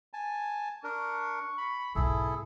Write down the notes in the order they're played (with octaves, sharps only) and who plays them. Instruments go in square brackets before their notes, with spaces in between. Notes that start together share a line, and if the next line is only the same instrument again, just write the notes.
[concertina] G#5 A5
[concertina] D4 A#4 [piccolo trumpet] C#6
[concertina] B5
[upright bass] B1 G#2 [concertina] E4 G#4 A4